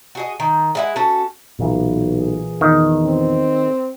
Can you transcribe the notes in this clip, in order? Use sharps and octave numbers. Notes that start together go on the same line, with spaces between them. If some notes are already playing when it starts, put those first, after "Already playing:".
F#4 G#4 D#5
D#3
G#3 E4 F#5
C#4 F#4 A4
B1 A#2 E3
G#4
E2 D#3
C4